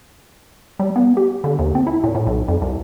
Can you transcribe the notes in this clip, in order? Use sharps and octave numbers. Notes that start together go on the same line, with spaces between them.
G3
B3
G4
D3
D#2
C4
E4
A#2
A2
B1
F2
C2